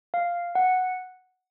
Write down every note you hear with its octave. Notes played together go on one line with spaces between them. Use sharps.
F5
F#5